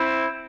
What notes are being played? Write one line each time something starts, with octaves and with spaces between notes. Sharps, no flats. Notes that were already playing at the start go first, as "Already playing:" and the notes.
Already playing: C4 E4